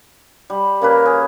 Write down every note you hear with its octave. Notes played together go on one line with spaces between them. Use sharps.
G3
C#3 A#3 A#4 B4
G#4